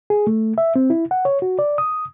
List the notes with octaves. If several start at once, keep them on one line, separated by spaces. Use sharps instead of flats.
G#4
A3
E5
C4
E4
F#5
C#5
F#4
D5
D#6